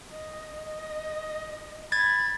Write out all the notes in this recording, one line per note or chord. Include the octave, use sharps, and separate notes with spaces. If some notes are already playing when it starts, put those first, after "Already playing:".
D#5
D#5
B5 G#6 A6